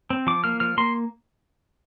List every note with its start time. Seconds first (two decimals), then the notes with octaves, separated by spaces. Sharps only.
0.10 C4
0.27 F3 D6
0.44 A#3 F6
0.60 F3 F6
0.78 A#3 C6